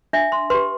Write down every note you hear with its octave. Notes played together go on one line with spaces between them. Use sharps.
D4 E5
C6
G4 B4 C6